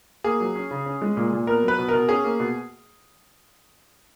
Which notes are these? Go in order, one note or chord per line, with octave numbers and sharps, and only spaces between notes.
A#3 G#4
F#3
C#4
C#3
C#4
G#3
A#2
A#2
B3 A#4
F#3
B4
B2
B2 A#4
C#4 G#4
A#3
B2